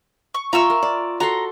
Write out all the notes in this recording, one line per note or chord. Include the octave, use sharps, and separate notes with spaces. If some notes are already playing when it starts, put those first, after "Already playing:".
C#6
F4 E5 A#5 C#6 E6
A#4
D5
F#4 A4 A#5 C6